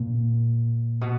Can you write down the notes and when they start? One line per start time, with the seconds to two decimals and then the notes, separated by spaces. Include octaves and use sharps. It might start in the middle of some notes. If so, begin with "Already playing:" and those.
Already playing: A#2
1.01 B2